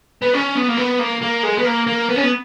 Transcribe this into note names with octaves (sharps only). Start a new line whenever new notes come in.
B3
C#4
B3
A#3
B3
A#3
A#3
G#3
B3
A#3
A#3
B3
C#4
B3